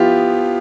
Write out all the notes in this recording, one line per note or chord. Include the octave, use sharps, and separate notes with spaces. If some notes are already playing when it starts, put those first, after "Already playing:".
Already playing: F3 B3 E4 F4 G4